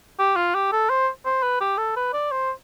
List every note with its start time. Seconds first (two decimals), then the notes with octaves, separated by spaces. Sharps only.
0.19 G4
0.36 F4
0.55 G4
0.72 A4
0.89 C5
1.25 C5
1.43 B4
1.61 G4
1.78 A4
1.96 B4
2.13 D5
2.32 C5